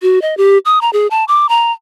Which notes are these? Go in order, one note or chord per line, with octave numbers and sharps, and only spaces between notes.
F#4
D#5
G4
D#6
A#5
G#4
A5
D6
A#5